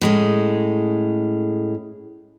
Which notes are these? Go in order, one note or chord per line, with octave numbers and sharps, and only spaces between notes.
A2 G#3 C#4